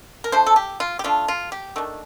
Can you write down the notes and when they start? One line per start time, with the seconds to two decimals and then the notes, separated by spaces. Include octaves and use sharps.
0.24 A#4
0.32 F3 A3 D4 C5
0.46 A4
0.56 G4
0.80 F4
0.99 G4
1.04 F3 A3 D4 F4
1.28 F4
1.52 G4
1.76 D#3 A3 D4